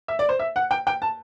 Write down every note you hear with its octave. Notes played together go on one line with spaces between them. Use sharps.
E5
D5
C5
E5
F#5
G5
G5
A5